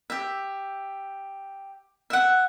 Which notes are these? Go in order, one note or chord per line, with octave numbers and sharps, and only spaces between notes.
G4 E5
E5 F#5